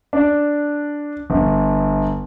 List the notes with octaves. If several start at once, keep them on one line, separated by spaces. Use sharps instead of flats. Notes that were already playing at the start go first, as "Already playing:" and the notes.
D4
G1